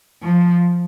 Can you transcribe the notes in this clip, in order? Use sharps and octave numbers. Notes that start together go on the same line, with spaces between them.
F3